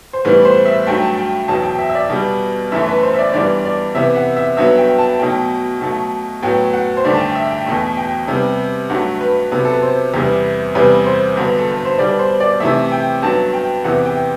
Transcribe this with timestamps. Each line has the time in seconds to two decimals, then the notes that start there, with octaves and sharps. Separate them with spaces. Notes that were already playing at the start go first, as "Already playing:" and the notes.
0.13 C5
0.25 A2 E3 G3 B3 B4
0.45 C5
0.66 E5
0.87 G2 F#3 A3 G5
1.02 A5
1.18 G5
1.48 E2 B2 F#3 A5
1.63 G5
1.79 E5
1.89 E5
1.95 D5
2.10 B2 G3 B3
2.72 F#2 E3 A3 E5
2.88 B4
3.03 C5
3.14 E5
3.19 D5
3.33 G2 E3 G3 B3 D5
3.65 D5
3.95 C3 E3 B3 E5
4.16 F#5
4.37 E5
4.57 G2 F#3 B3 E5
4.78 G5
4.98 A5
5.19 B2 F#3 A3 G5
5.81 B2 F#3 A3
6.42 A2 F#3 B3 G5
6.73 F#5
6.97 C5
7.05 G2 D3 A3 D5
7.14 A5
7.20 G5
7.35 E5
7.51 G5
7.66 E2 B2 A3
7.97 G5
8.28 C3 G3 B3
8.90 G2 F#3 A3 F#5
9.21 B4
9.51 C3 F#3 B3 B4
9.65 A4
9.73 B4
9.82 C5
10.14 E2 C3 G3 B3
10.75 E2 C3 G3 B3 B4
11.06 C5
11.37 G2 D3 F#3 B3
11.58 A4
11.71 B4
11.85 C5
11.99 B2 G3 B3 D5
12.19 C5
12.40 D5
12.60 C3 E3 A3 E5
12.92 G5
13.22 G2 F#3 B3 A5
13.53 G5
13.84 E2 C3 E3 B3 F#5
14.05 G5